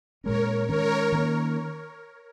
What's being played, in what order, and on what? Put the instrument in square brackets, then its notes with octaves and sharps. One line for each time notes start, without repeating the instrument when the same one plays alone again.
[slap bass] A#2 G#3 C#4 [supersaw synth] A#4 C#5
[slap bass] D#3 G#3 C#4 [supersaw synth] A#4 C#5
[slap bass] D#3 A#3 C#4